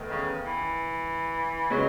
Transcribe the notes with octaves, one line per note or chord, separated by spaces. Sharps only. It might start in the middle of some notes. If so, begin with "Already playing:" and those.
Already playing: E2 D#3 A3
C#3
E3
C#3 F#3 G#3 B3